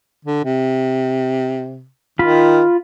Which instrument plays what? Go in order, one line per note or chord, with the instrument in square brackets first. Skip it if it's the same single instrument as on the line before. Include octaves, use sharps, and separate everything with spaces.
[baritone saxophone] D3
C3
[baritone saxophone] D#3 [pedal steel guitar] F4 B5